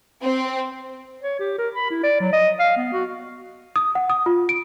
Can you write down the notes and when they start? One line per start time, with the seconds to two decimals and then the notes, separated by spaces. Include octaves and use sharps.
0.22 C4
1.22 C#5
1.39 G4
1.58 A#4
1.75 B5
1.90 E4
2.03 D5
2.20 F#3
2.32 D#5
2.60 F5
2.77 B3
2.93 F#4
3.76 D#6
3.95 F#5
4.10 D#6
4.26 F4
4.49 D7